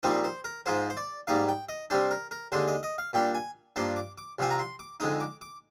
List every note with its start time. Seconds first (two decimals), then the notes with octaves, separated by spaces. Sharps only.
0.03 A#1 A#2 G3 C4 D#4 C5
0.24 C5
0.44 A#4
0.66 G#2 F3 G#3 D#4 C5
0.90 C5
0.97 D5
1.27 G#2 G3 A#3 D#4 F5
1.48 G5
1.69 D#5
1.90 C3 G3 D4 C5
2.11 A#4
2.31 A#4
2.52 D#2 D3 G#3 D4 C5
2.68 D#5
2.83 D#5
2.98 F5
3.13 A#2 G3 D4 G5
3.34 G#5
3.76 G2 F3 A#3 D4 C6
3.96 D6
4.18 D6
4.39 C2 C3 F3 C4 G#5
4.50 A#5
4.59 C6
4.79 D6
5.00 F2 D3 G#3 D#4 D#6
5.20 D6
5.41 D6